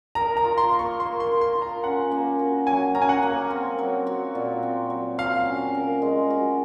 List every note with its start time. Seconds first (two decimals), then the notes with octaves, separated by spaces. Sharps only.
0.15 A#4 A#5
0.37 A#5
0.44 F4
0.58 C6
0.71 A#3
0.79 C#6
1.00 A#3 C6
1.20 C6
1.27 A#4
1.41 C6
1.55 F4
1.62 A#5
1.84 C#4 F#5
2.11 A#3
2.39 F#4
2.67 F#3 G#5
2.95 C#4 A#5
3.02 G#5
3.09 F#5
3.23 A#3
3.50 C4
3.78 F#3
4.07 F#4
4.35 A#2
4.63 C4
4.90 F#3
5.18 F#4 F5
5.46 C#4
5.75 A#4
6.02 G#3
6.30 F#4